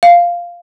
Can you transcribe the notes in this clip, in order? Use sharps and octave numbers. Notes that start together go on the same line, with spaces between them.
F5